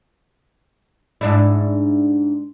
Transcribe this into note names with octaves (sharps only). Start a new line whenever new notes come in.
G#2 D4 E4